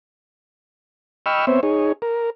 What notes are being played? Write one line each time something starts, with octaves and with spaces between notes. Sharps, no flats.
D#5 G5 B5 C#6 E6 F6
B3 C4 C5 C#5 E5
D#4 G#4 C#5
A#4